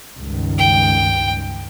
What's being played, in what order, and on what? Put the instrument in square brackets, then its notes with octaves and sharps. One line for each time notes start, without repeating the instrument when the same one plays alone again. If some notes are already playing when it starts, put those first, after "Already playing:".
[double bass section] C#2 G2 D#3
[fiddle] G5